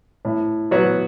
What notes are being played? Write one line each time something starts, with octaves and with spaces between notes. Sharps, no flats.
A2
F#3 B3 F#4 C#5